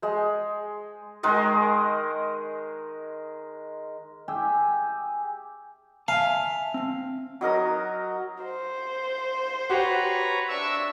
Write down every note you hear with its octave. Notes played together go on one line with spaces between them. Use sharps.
G#3 C5
D#3 G#3 A#4 D#5
G4 G#4 E5 G5
E5 F5 G#5 A5
C4
F#3 D#4 A#4 D#6
C5
F#4 G4 B4 C#5 A#5
D4 E5 C#6 E6